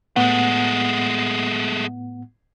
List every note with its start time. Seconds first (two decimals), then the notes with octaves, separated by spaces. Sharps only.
0.16 A2 G#3 A3 B3 F#5